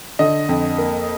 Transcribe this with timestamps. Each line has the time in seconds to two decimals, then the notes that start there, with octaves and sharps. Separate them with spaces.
0.19 D3 D#5
0.49 F2
0.78 A#3